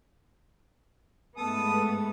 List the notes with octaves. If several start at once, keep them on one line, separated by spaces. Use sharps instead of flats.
G#2 A3 B3 A4 D#6